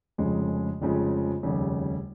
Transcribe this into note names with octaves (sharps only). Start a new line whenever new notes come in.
F1 F2 C#3 F3 G#3
F1 F2 C#3 F3 G#3
F1 D#2 C#3 G3